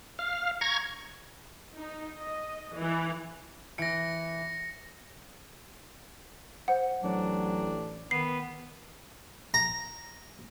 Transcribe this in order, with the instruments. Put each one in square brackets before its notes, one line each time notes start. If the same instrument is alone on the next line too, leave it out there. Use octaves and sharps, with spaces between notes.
[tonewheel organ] F5
A#5 C#6 G#6
[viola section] D#4
D#5
E3
[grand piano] E3 D7 [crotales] A#6 C#7
[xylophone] C5 F#5
[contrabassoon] A1 [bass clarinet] F#3 [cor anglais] D4
[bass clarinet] D#3 [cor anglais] B3 [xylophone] C7
[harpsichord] A#5